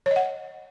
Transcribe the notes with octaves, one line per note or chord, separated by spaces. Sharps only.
C#5
D#5
F#5